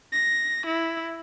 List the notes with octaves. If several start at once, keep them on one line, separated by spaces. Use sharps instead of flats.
A#6
E4